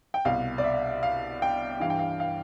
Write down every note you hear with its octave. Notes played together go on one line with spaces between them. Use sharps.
G5
C2 B2 F5
D5
E5
F5
G5
G2 E3 F5
G5
F5
F5